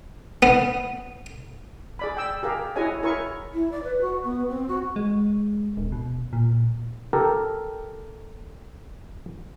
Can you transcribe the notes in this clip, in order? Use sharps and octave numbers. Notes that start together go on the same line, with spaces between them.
B3
G#4 D5 B5
G5 E6
G4 G#4 A#4 F5
E4 F#4 G#4 C#5 D#5 G#5
E4 A#4 C#5 G#5 C#6
E4
D5
B4
F#4
B3
C4
F#4
G#3
D1
B2
A#2
G4 A4 A#4